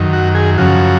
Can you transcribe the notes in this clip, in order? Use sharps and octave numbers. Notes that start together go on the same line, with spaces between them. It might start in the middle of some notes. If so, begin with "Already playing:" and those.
Already playing: F#2 D#3
F#4
G#4
F#2 C#3 F3 F#4